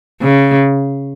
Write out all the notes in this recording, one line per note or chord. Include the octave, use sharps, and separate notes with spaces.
C#3